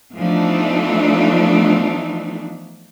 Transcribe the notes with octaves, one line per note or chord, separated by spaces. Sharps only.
E3 F3 A3 B3 D4 D#4